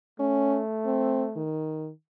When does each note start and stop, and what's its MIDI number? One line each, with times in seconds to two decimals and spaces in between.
0.20 1.45 57
0.20 0.60 61
0.85 1.26 60
1.36 1.91 51